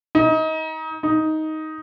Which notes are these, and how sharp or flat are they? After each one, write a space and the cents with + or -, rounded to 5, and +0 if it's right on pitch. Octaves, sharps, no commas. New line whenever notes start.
D#4 +30
D#4 +10